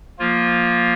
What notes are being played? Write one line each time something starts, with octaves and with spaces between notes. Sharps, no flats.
F3 A#3 F4